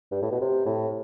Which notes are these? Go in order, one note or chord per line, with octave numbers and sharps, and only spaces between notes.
G2
A2
B2
C3
A2